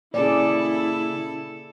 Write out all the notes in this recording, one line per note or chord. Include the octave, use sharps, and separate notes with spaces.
A#2 C#3 E4 G#4 A4 D5